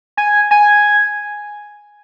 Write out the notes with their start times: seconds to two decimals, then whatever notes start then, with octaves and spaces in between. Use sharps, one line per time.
0.17 G#5
0.51 G#5